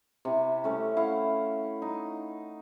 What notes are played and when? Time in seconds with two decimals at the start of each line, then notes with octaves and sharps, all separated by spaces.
0.25 C3 E4
0.64 A3 C#4
0.97 E4 F5 F#5
1.82 D#4